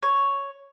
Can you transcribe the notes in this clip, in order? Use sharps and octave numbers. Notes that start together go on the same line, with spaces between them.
C#5